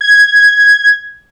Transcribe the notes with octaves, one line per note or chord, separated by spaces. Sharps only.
G#6